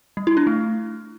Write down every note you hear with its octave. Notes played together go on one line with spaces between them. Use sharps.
G3
E4
D4
A3